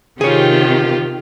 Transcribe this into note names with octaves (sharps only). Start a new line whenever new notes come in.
C3 D#3 F4 G4 G#4 C#5